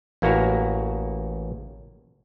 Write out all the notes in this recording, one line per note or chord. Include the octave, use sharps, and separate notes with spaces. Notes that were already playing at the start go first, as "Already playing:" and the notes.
A1 A#3 E4 F#4 A#5